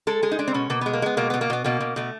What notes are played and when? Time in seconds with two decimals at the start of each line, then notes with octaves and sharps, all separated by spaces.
0.07 G#3 A4
0.23 G#3 G#4
0.31 D#4
0.39 G#3 D4
0.48 C4
0.54 B2 C#4
0.70 B2 A#3
0.81 G#3 B3
0.93 A#3
1.02 G#3 B3
1.17 B2 A#3
1.30 B2 B3
1.41 A#3
1.50 B2 B3
1.64 B2 A#3
1.80 B2
1.96 B2 A3